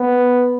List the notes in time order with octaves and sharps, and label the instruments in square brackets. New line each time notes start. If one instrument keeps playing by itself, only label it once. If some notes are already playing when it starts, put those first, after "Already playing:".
Already playing: [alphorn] B3